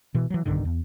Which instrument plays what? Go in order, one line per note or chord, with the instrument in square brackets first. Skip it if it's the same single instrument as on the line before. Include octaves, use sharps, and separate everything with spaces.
[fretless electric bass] B2 E3
E3 F#3
B1 G2 D3 D#3
E2